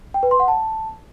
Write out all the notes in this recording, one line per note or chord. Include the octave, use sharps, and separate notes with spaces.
G5
B4
C6
F#5
A5